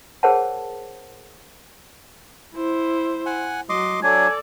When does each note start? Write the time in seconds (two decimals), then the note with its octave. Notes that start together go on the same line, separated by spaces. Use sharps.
0.23 G#4 A#4 C5 C#5 F#5 A5
2.54 E4 C5
3.26 F#5 G#5
3.69 F#3 D#5 C6 D6
4.03 F#3 D4 A4 D5 G#5